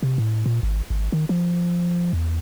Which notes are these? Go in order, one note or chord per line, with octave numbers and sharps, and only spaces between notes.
C3
A2
A#2
G#1
G#1
D#3
F3
E2